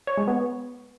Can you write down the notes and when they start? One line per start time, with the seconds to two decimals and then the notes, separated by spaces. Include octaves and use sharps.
0.07 C#5
0.17 G#3
0.28 B3